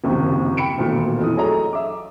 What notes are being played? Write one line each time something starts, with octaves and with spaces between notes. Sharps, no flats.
F#1 D#2 C3 D#3 F3
G5 B5 C#7 D7
E1 D2 A#2 D#3
F2 E3 D#6
F#3 A3 G#4 C#5 D#5 A#5
E5 D6